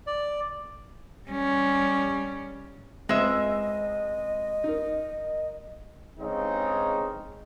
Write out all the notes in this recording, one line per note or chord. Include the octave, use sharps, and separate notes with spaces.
D5
G3 C#4
C#2 G#3 C4 D#5 E5
D#4 A#4
G2 C#3 G#3 C4 C#4 D#4